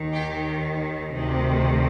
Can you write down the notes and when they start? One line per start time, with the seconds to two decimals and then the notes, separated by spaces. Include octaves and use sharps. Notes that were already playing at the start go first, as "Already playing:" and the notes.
Already playing: D#2 D#3
0.13 G4
1.12 D2 C3 D#3